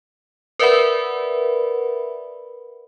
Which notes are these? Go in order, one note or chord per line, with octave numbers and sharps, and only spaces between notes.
A#4 B4 D5 E5 F#5 B5